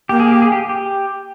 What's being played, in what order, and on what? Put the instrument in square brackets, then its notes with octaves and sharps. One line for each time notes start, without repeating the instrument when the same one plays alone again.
[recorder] A#3 [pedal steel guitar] G4
[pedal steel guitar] G#4
G4
G#4
G4
G4